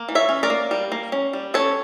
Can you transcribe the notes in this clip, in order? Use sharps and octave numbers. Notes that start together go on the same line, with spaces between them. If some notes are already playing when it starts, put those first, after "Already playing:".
Already playing: A#3
E3
C#5 E5
C#4
A#4 D5
A#3
G3
A#3
C#4
G3
C#4 A4 C#5